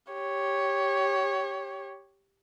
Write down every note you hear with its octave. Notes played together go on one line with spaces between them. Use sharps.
G4 C#5